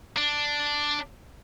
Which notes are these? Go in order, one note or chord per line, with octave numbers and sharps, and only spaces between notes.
D4